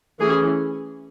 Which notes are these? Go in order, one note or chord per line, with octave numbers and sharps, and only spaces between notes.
E3 A3 C#4 G#4